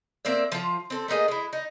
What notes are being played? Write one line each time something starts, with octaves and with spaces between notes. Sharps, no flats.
A#3 C4 D5 E5
F3 F4
C4 A4
A3 A#3 D#4 G#4
G#3 E4
D#4